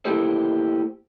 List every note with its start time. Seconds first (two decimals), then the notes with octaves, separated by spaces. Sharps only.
0.05 A#3 E4 G4 A4 C5